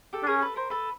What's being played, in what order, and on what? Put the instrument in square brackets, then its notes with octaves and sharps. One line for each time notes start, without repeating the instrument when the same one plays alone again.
[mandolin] G4 A4
[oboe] D4
[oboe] C#4 [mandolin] G#4 A#4
[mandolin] A4 B4
A#4 C5
A4 B4